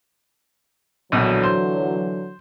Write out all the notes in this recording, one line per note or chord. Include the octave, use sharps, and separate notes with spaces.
A#1 B2 D3 E3 F#3
C5